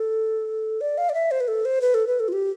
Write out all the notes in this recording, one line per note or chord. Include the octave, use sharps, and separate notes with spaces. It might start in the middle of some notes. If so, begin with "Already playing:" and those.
Already playing: A4
D5
F5
D5
E5
C5
B4
A4
C5
B4
A4
B4
A4
F4
G4